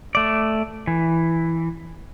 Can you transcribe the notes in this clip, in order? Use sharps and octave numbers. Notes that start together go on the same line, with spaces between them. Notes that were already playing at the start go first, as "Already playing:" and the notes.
A3 D5
E3